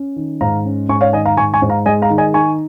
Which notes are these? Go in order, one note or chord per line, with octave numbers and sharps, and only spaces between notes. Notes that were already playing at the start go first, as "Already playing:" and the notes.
Already playing: C#4
D#3
G#2 F5 A#5
C#4
G#2 G#5 C#6
C#5 F5
D#3 D#5 G#5
F5 A#5
G#2 G#5 C#6
G#5 C#6
G#2
F5 A#5
G#3 D#5 G#5
F5 A#5
D#3
D#5 G#5
D#4 G#5 C#6